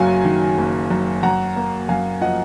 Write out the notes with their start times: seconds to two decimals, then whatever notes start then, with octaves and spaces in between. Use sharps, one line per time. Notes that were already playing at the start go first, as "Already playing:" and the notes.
Already playing: F#1 F#2 F#3 F5 G#5
0.25 D#3
0.58 F#1
0.90 F#2
1.23 F#2 F#5 A#5
1.56 A#3
1.89 F#2 F5 G#5
2.21 F3 D#5 F#5